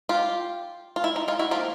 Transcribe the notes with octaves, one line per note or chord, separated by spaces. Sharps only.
F4 G4
F4
E4
D#4
D#4 F4
E4 F#4
F3 A#3 D#4 F4 G4